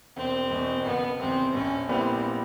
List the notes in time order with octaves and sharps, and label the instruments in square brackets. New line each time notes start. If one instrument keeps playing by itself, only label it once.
[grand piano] E1 [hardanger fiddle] C4
[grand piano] E2 B2
[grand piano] F#1 [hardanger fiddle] B3
[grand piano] E2 C3 [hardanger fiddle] C4
[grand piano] A#1 [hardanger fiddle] C#4
[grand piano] A#2 G3 B3 E4 [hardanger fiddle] C4